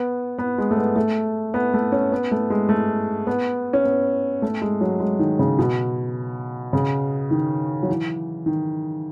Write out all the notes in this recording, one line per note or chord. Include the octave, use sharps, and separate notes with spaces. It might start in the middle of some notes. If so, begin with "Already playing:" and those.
Already playing: B3
B3
G#3
A3
B3
A3
B3
A3
C#4
B3
A3
G#3
A3
B3
C#4
B3
A3
G#3
F#3
G#3
D#3
C#3
B2
C#3
D#3
F#3
E3
D#3